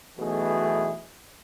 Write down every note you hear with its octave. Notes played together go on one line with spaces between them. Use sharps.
B1 B2 E3 A3 G#4